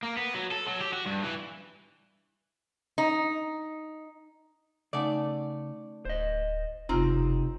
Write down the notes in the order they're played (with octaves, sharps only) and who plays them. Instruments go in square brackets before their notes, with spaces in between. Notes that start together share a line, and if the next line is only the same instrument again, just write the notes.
[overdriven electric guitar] A#3
B3
F#3
A4
F#3
G4
F#4
G2
E3
[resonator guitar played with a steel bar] D#4
[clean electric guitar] C#3 [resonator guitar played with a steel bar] A3 D5 [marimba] D#4 F#5 G#5
[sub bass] D1 [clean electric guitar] C5 D#5
[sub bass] F#1 [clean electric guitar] C3 D#4 [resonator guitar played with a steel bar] C4 [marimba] F4 A#5 F6